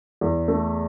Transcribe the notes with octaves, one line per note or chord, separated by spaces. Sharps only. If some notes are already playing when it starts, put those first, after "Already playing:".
E2
A3